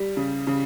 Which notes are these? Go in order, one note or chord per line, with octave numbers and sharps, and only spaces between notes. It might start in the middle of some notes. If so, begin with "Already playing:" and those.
Already playing: G3
C#3
C#3